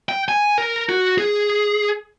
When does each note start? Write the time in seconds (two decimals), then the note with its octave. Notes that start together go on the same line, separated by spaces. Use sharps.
0.09 G5
0.29 G#5
0.58 A#4
0.89 F#4
1.18 G#4